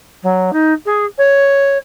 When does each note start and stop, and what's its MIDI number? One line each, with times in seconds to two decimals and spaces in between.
0.23 0.50 54
0.53 0.73 63
0.86 1.05 68
1.18 1.78 73